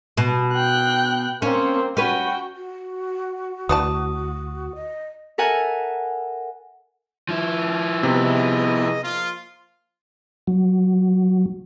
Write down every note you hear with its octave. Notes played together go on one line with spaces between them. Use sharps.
B2
G5 F#6
A#3 C4 C#4
C#4 F#4 B4 G5
F#4
D2 E3 D5 A5 D#6
D#5
A4 A#4 E5 F#5 G#5
F3 E4
C3 B3 G#4 D#5
F3 A#3 F4
F#3